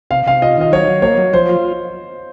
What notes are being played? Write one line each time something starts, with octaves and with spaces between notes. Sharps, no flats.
C3 F5
C3 F5
F4 D#5
D#3 D#5
F#3 C#5
F#3
A#3 C#5
F#3
F3 C5
F4